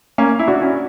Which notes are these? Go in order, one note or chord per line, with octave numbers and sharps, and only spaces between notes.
A#3 C#4
E4
D4 F#4
C#4 E4